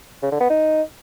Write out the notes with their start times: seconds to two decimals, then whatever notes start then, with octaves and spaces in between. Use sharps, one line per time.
0.23 C#3
0.32 D3
0.41 B3
0.50 D#4